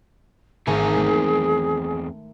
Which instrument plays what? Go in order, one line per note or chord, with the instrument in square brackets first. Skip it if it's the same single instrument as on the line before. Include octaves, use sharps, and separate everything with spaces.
[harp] G#1 A3 A#5 [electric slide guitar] E2 C4 G#5 [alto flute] G#4
[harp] A3